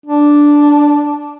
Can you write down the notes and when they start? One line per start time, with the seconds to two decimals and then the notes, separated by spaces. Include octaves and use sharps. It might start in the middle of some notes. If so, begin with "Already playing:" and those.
0.06 D4